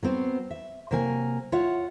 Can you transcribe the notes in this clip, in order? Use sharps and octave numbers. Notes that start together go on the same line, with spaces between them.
F#3 B3 C4 C5
E5
C3 F#3 A#3 A#4 B4 G#5
F4 C#5 E5 F#5